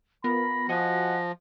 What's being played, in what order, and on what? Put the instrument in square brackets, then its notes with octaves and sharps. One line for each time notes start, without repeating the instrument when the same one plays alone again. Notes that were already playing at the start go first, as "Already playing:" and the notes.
[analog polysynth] B3 F4 A#4 [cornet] B5 [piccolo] A#6
[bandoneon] F3 [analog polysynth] F#4 D#5 G#5 [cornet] F#5